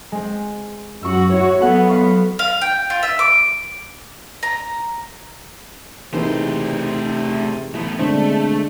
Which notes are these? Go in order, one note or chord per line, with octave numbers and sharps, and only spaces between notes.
G#3 C4
F#2 F#4 C#6 E6
E4 F#4 C#5
F#3 B3 A4 F#5
B4 F5 C#6
F5
G5
F4
E5
D6
A#5
C3 E3 A3 A#3 D#4 G#4 B4 C5
E3 A3 B3
B2 D3 G#3 A3 C4 D4 C5